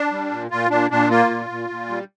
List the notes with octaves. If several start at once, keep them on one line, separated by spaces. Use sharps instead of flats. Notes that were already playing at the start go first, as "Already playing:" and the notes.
Already playing: D4
G3
A#2
A#2 F4
A#2 D4
A#2 D4
A#3 F4
A#2
A#2
A#2
G3